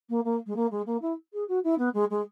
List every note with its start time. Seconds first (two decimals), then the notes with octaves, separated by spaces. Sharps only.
0.09 A#3
0.24 A#3
0.46 G#3
0.56 A#3
0.71 G#3
0.86 A#3
1.01 E4
1.33 G#4
1.48 F#4
1.64 E4
1.78 B3
1.94 G#3
2.10 G#3